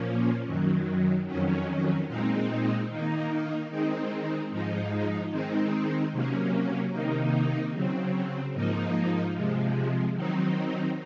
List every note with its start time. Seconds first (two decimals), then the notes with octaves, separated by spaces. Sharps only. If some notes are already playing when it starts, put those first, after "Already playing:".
Already playing: A#2 F3 A#3 C#4
0.46 F#2 D#3 F#3
1.27 F2 D#3 F#3 C#4
2.08 A#2 G#3 C4 D#4
2.88 D#3 A#3 D#4
3.70 D#3 G#3 C4 D#4
4.51 G#2 F3 G#3 D#4
5.31 D#3 G#3 C4 D#4
6.12 C3 F#3 A#3 C#4
6.92 C3 D#3 A#3 D#4
7.73 C#3 F#3 C4
8.54 G#2 F3 A#3 D#4
9.35 C3 F3 G#3
10.16 D#3 F#3 C4 D#4